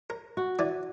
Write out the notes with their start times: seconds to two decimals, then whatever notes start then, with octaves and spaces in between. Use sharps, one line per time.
0.10 A#4
0.37 F#4
0.59 E3 D5